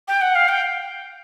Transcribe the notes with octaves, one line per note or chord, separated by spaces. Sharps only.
G5
F#5
F5
G5